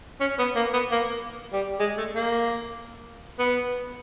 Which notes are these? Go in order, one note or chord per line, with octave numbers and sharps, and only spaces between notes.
C#4
B3
A#3
B3
A#3
G3
G#3
A3
A#3
B3